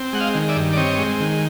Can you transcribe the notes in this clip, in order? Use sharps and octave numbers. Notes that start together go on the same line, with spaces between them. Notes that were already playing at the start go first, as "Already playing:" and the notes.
Already playing: C4
G#3 F#5
D#5 F5
D#3
D5 E5
G2
D5
C4 C#5 D#5
G#3
D#3